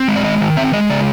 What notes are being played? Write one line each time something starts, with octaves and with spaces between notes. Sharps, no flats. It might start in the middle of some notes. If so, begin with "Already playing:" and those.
Already playing: C4
G#3
D5
D#3 D#5
D#3
C4 E5
G#3 D#5
C#3 D5